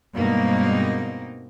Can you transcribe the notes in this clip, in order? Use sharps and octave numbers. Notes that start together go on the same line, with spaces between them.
G2 B2 G#3 A#3 C4 D#4